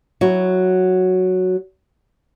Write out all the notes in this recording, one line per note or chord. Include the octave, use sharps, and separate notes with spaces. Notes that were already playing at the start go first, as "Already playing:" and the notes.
F#3 E4 F#4